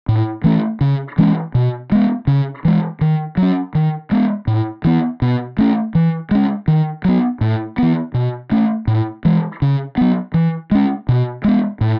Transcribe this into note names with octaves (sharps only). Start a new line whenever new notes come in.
A2
E3 A3 C#4
C#3
E3 G#3 C#4
B2
G#3 B3
C#3
E3 G#3
D#3
F#3 C#4
D#3
G#3 B3
A2
E3 B3
B2
A3 C#4
E3
G#3 C#4
D#3
F#3 B3
A2
E3 B3
B2
A3 C#4
A2
E3 G#3
C#3
F#3 B3
E3
G#3 C#4
B2
G#3 B3
A2